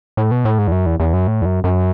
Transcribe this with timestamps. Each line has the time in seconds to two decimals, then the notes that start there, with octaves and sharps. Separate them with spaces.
0.17 A2
0.31 B2
0.45 A2
0.58 G#2
0.67 E2
0.72 F#2
0.86 E2
1.00 E2
1.13 F#2
1.27 A2
1.42 E2
1.45 F#2
1.64 F#2